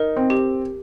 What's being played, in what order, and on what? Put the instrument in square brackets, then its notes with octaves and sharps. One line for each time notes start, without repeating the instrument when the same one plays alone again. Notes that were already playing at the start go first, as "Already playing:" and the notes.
Already playing: [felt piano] D#4 [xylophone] A#4
[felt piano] C4
[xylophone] G4